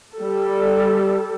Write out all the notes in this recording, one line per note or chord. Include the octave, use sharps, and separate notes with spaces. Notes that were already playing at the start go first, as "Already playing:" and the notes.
G3 A4